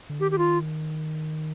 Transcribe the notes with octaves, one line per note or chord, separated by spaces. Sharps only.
D3
D#3 G4
G4
F4